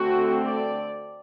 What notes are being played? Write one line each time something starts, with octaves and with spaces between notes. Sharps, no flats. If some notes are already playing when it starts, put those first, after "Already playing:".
Already playing: D3 A3 C4 F#4
D5